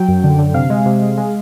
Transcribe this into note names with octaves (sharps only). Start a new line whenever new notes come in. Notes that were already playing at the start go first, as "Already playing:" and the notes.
Already playing: F#3 G5
F#2
D3
D3
C3 F5
G#3
C3
G#3
G#3